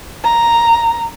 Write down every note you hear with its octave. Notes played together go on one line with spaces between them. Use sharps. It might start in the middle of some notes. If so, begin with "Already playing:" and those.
A#5